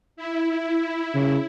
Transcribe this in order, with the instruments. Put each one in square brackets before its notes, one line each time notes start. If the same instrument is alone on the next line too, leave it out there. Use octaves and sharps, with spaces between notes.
[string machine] E4
[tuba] C#3